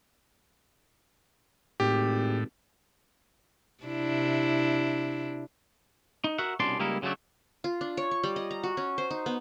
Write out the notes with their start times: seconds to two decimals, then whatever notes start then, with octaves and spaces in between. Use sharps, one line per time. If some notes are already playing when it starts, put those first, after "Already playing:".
1.80 G#1 A2 G4
3.84 C3 D4 E4
6.24 D#4
6.38 F#4 A#4 E5 F#5
6.60 C2 B2 C#4 D4 D5 C6
6.79 C#2 G3 A#3 D#4 E4 A#4
7.02 C#3 F#3 G#3 A3 D4
7.64 F4
7.81 D4
7.97 C#5
8.11 C#6
8.23 G3
8.36 D#5
8.51 A#5
8.63 F#4
8.77 C#4
8.98 C5
9.11 D#4
9.26 B3